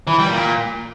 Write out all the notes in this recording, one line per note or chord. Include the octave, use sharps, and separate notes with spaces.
E3
G3
A#2